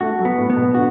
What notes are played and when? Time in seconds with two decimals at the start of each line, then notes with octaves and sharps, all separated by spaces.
0.01 A3 F#4
0.19 F#3
0.25 B3
0.38 A2
0.50 B3
0.56 B2
0.74 D3 F#4